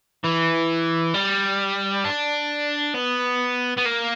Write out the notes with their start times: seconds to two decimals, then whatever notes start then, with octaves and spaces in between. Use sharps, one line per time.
0.24 E3
1.14 G3
2.05 D4
2.94 B3
3.77 B3
3.85 A#3